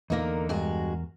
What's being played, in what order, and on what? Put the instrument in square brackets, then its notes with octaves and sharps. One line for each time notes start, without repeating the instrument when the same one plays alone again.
[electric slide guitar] E2 A#4 [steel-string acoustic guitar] D3 A#3 D#4
[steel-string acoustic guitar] G2 G#3 F#4